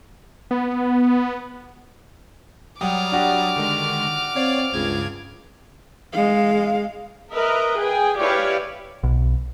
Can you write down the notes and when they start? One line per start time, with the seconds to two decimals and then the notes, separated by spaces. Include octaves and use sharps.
0.51 B3
2.81 F#3 G3 F#5 G5 D6 D#6 F6
3.12 D4 F#4 G4
3.56 D3 D#3 G#3
4.36 C4 C#5 D5 F5
4.73 C#2 G2 C#3 G#6
6.13 G#3 F5
7.32 A#4 B4 D#5 E5
7.77 G#4 G5 G#5
8.19 E4 G4 B4 C#5 D5 F5
9.03 B1